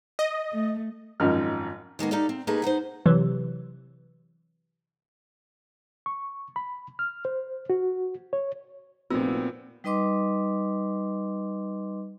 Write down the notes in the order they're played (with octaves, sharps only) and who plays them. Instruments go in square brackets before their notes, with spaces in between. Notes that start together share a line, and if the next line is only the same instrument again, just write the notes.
[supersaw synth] D#5
[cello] A3
[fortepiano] G#1 F#2 F3 D#4 F6
[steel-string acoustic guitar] D#3 G#3 A#3 B3
D#4 G4 A4 D5 F5
C4
A3 A#3 D#4 G4 G#4 B4
B3 D#4 G#4 C5
[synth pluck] C3 E3 F#3
[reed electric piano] C#6
B5
F6
C5
F#4
C#5
[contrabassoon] F1 [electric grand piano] A#2 B3 [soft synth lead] C4 [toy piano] F4 F#4 E6
[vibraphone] G3 D#4 B4 D#5 C6 D6